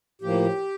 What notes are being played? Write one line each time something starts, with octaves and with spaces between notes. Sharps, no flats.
A2 F3 A#3 G4